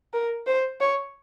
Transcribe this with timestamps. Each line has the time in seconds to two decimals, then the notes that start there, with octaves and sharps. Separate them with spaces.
0.13 A#4
0.47 C5
0.80 C#5